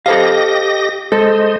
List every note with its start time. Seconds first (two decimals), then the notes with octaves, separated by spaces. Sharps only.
0.06 G4 A4 C5 D#5 F5 A#6
1.12 G#3 A4 C5 D#5